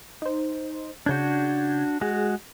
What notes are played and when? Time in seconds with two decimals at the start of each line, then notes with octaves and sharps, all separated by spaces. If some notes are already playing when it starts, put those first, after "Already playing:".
0.22 D#4 C5
1.06 C#3 D4 F#4 G6 G#6
2.01 G#3 F#4 G#4